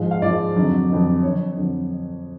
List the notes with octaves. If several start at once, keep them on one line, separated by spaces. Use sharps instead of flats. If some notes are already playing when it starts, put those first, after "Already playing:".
Already playing: G#2 F3 G#3 F5
F5
G#2 F3 G#3 D5
F2 D3 F#3
F2 D3 F#3
F2 D3 F#3 C#5
F2 D3 F#3